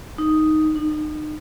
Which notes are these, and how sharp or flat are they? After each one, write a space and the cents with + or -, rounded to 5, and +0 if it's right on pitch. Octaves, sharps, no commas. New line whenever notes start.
D#4 +0
D#4 -35